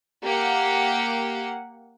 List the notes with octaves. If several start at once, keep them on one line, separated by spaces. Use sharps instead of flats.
A#3 G4 F#5